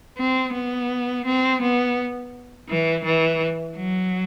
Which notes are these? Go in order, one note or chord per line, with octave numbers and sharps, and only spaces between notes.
C4
B3
C4
B3
E3
E3
F#3